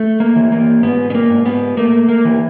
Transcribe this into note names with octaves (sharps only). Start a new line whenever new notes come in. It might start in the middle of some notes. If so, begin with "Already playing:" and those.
Already playing: A3
A#3
E3
A#3
G#2 B3
B3
A#3
G#2
B3
A3 A#3
A#3
E3